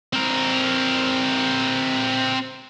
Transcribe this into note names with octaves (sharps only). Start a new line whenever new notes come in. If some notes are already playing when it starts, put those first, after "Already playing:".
C4 A#4